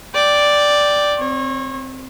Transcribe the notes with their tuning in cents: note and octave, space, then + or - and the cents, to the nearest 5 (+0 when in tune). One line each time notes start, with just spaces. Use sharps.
D5 +0 G5 +0
C4 +0 C#5 -30